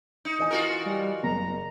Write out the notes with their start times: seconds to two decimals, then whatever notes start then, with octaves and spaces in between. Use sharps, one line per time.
0.25 D#4
0.39 E3 D#5 G#5
0.51 F4 F#4 A#4
0.85 G3
1.23 F#1 A#5